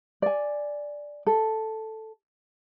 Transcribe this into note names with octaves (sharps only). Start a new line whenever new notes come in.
D5 G#5
A4